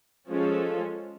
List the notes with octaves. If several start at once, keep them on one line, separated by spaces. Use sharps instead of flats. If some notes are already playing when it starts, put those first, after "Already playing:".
F3 G#3 C#4 F4 A4